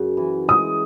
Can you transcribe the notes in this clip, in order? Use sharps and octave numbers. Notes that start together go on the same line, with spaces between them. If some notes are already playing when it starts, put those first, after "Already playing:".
Already playing: F#2 C#3
E3
G#3 D#6